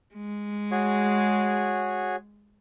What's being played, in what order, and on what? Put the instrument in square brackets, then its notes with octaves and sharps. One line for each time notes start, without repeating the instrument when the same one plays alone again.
[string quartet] G#3
[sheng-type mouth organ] F#4 G#4 C#5